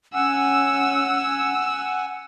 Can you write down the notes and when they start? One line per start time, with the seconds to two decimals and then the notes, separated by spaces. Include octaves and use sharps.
0.14 C#4 F#5 G#5 E6